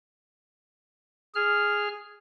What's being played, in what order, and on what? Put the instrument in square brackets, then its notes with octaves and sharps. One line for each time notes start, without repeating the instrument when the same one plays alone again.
[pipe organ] G#4 F6